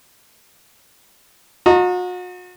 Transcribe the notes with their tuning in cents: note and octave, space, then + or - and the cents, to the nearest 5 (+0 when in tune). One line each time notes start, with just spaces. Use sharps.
F#4 -40 D#5 +0 A#5 -15